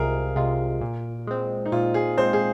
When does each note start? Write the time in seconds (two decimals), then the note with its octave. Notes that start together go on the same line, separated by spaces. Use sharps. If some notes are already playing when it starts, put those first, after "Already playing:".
Already playing: C2 C3 G#3 F4 G#4 A#4
0.36 C3 G#3 F4
0.81 A#2
1.27 G#3 C4
1.66 D#4
1.72 A#2 F4
1.94 G#4
2.17 G#3 C4 C5
2.33 G#4